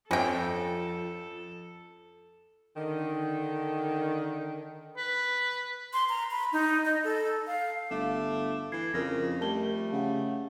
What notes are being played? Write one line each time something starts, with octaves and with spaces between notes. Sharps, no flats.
F2 F3 C#4 A4 G5
D3 D#3
B4
C6
A#5
B5
D#4
D#5
A4
F5
G1 A3 F5 D6
E3 G#6 C7
F2 C#3 F4 A#4 A#6
G3 A3 A#4 A5 G7
C#3 F5 F#5